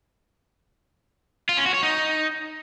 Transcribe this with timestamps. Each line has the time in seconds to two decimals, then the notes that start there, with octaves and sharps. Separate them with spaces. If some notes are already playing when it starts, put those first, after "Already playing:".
1.49 F4
1.57 C#4
1.66 F#4
1.74 C#5
1.83 D#4